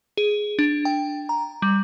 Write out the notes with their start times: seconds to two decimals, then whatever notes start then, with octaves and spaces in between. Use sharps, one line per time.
0.17 G#4
0.59 D4
0.85 G5
1.29 A#5
1.62 G3